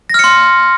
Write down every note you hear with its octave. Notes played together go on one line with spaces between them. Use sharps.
C6 F6 A#6 C#7